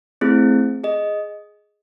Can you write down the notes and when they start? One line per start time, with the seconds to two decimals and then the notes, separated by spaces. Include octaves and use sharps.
0.21 A3 C4 E4 G#4
0.84 G#4 D#5